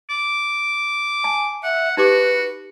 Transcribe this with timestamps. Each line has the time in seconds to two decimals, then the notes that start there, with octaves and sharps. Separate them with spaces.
0.10 D6
1.24 G#5 A5
1.64 E5 F#5
1.97 D#4 F#4 G4 B4 D6